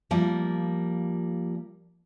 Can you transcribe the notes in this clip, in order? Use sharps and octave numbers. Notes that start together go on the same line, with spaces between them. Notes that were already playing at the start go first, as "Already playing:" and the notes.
F3 G3 A#3